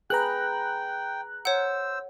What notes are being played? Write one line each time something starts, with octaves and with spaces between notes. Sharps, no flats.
G#4 B4 G5 A#5 F#6
C5 C#5 F#5 E6